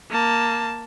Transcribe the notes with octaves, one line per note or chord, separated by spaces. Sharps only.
A#3 A5